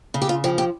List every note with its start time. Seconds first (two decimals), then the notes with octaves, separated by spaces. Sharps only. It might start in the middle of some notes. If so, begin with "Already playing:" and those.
0.14 C#3
0.22 G4
0.29 F4
0.44 F3 G4
0.58 G4